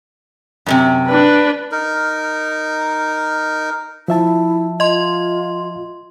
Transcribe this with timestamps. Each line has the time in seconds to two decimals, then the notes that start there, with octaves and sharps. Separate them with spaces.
0.66 F#2 A2 C3
1.06 D4 B4
1.72 D#4 A#4
4.08 F3 E4 E5 A5
4.80 F4 D#5 C6